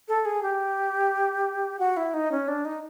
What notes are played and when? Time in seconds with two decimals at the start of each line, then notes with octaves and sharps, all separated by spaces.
0.08 A4
0.25 G#4
0.43 G4
1.79 F#4
1.97 E4
2.14 D#4
2.32 C#4
2.48 D4
2.65 D#4